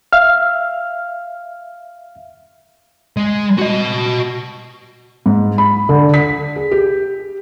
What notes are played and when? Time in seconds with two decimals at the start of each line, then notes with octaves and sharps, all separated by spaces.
0.12 E5 F5 F6
3.17 G#3
3.58 F#4 D#5
5.26 G#2
5.58 B5
5.89 D3
6.14 B6
6.56 G#4
6.72 G4